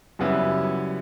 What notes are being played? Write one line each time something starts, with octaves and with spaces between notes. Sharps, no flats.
F#2 C#3 G3 B3 E4